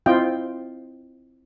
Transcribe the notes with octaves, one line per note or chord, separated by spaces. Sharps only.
C4 E4 F4 D#5 G5